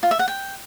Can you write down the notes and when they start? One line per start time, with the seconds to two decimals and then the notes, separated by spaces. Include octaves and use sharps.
0.03 F4
0.11 E5
0.19 F#5
0.28 G5